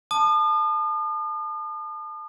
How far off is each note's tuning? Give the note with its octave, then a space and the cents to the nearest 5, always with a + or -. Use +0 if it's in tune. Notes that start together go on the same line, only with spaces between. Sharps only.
A5 +0 D#6 -45